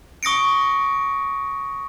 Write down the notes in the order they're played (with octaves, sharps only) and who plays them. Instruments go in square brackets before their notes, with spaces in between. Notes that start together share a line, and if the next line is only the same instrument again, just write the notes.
[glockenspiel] C#6 D#6 A#6 C#7 D7